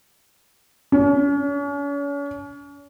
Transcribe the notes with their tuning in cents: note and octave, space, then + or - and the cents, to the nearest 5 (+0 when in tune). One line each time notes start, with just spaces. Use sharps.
C#4 +40